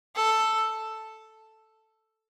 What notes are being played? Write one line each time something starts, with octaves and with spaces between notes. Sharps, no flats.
A4